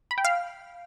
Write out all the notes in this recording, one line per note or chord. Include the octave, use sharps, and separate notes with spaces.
B5
G5
F5